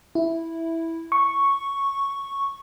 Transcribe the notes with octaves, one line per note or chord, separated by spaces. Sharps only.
E4
C#6